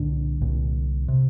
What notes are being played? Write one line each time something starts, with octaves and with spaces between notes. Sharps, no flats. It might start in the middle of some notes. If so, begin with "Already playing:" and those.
Already playing: C2 A#2 D3 D4
C2 A#2
C3